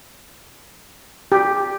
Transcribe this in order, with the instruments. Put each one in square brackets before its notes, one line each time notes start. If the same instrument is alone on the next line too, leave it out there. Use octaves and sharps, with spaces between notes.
[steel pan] G4